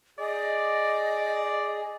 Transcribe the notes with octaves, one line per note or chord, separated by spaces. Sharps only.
G#4 D5 D#5